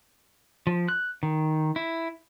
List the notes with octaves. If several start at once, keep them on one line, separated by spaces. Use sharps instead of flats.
F3
F#6
D#3
E4